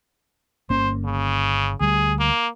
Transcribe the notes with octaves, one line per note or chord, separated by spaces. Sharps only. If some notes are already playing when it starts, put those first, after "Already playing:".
G1 A#3 C#4 C5
C#3
D2 G3 G#4
A#3